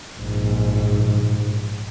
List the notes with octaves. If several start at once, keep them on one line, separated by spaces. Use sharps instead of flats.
A#1 G#2